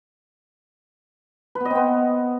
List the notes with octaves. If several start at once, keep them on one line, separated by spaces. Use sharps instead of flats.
B4
B3
D#5
C4
B3